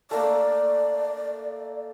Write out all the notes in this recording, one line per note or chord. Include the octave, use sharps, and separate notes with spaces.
A3 A#3 D5